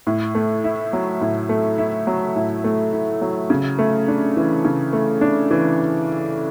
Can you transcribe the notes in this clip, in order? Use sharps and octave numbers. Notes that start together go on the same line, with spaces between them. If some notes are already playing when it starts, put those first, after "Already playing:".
A2
A3
E4
F#3
A2
A3
E4
F#3
A2
A3
E4
F#3
C#3
A3
D4
E3
C#3
A3
D4
E3